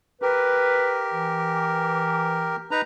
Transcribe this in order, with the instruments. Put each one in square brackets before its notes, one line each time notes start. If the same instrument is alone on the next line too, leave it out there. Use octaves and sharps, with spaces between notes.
[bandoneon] G4 A#4 [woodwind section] B4
[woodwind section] E3
[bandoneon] D#4 B4 A#5